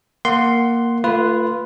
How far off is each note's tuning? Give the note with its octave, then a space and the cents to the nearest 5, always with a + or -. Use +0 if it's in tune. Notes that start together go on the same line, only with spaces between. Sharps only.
A#3 +0 F#5 +15 C6 +0
A3 +35 F4 -10 B4 +0